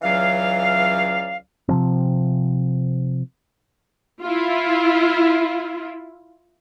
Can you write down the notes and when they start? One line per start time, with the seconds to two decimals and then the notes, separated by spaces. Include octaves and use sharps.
0.02 C#2 E3 F#3 C#4 D5 F5
1.69 C3 F3 C4
4.22 E4 F4